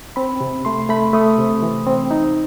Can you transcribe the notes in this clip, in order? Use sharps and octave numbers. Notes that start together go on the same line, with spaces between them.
C4 B5
C3
A3 C6
A3 B5
A3 D#6
C3
E3
C4
D#4